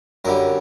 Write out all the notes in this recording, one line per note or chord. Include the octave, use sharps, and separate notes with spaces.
F#2 D3 G3 A#4